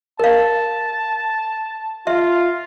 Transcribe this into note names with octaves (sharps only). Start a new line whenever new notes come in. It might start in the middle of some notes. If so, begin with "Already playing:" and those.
A#4 F5 A5
F4 E5